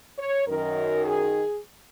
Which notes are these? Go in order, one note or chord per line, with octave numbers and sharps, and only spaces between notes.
C#5
F#2 D#3 A#4
G#4